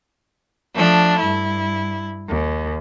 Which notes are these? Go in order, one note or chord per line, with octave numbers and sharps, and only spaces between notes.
F3 A3 D4
G2 E4
D#2